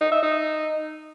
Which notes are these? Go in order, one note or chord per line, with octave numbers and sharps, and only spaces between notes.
D#4
E5
D#4